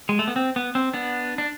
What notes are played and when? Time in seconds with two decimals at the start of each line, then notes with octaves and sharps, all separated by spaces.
0.09 G#3
0.19 A3
0.28 B3
0.36 C4
0.56 B3
0.75 C4
0.94 B3 D4
1.38 D4